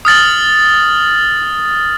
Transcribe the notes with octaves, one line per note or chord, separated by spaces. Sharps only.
D#6 F6 A6 F#7